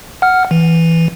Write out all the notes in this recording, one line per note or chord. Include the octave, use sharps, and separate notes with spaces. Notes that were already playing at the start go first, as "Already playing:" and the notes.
F#5 F6
E3